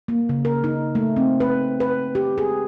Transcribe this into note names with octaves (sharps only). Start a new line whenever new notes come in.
A#3
C#3
A#4
D#4
A3
C4
B4
B4
G4
G#4